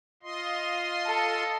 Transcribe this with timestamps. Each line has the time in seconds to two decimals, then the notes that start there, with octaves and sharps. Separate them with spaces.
0.23 F4 D#5 C6
1.07 A4